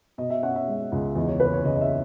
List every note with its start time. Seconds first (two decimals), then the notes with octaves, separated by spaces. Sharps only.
0.18 B2 D#5
0.30 E5
0.43 C#4 F#5
0.56 E5
0.68 G#3
0.92 C#2
1.15 E2 D#5
1.28 C#5
1.40 F#1 B4
1.53 C#5
1.65 C#3 D#5
1.76 D#5
1.81 E5